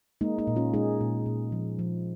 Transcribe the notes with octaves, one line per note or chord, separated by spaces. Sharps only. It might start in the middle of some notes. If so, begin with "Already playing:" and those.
G#3 A#3 D#4
A#3 D#4
A#2
C#4 F4
G#3 D#4 G#4
A#2
A#2
F3
F3